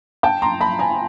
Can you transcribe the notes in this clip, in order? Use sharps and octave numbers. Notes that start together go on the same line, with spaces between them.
G5 A5
A#5 C6
A5 B5
G#5 A#5